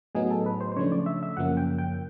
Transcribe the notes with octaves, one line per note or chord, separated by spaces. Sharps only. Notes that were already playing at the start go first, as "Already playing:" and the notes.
A2 F#3 B3 D#4 G#4
A4
B4
C5
C5
C#3 F3 A3 D4 C#5
D5
E5
E5
F#2 C#3 F3 A#3 C#4 F#5
G5
G5